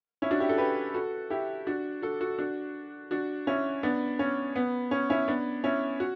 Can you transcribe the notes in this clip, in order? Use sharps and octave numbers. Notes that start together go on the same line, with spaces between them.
C#4 E4
D4 F#4
E4 G4
F#4 A4
G4 B4
F#4 A4
E4 G4
D4 F#4
F#4 A4
F#4 A4
D4 F#4
D4 F#4
C#4 E4
B3 D4
C#4
B3
C#4
C#4 E4
B3 D4
C#4 E4
F#4